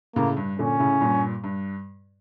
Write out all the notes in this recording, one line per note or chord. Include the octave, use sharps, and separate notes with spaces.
A2 C#3 A#3
G2
A#2 D3 C#4
A2 C#3
G2 A#2
G2